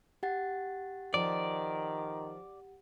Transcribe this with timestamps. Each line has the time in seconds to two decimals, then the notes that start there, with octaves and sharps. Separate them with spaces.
0.23 G4 F#5 A6
1.14 D#3 F3 D5